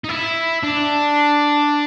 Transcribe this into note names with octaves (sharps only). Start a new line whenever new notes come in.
D#4
E4
D4